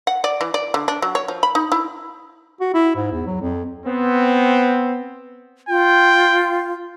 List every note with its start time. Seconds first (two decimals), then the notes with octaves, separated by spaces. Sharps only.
0.07 F#5
0.24 D5
0.41 E3
0.54 D5
0.74 D3
0.88 D4
1.02 F#3
1.15 C#5
1.28 F3
1.43 B5
1.55 D#4
1.72 E4
2.61 F#4
2.74 E4
2.96 G#2
3.12 E2
3.27 F#3
3.41 F2
3.86 B3 C4
5.69 F4 G5